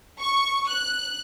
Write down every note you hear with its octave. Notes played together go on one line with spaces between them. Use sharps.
C#6
F#6